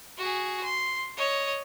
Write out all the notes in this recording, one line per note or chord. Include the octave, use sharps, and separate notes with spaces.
F#4 G#4
C6
C#5 D#5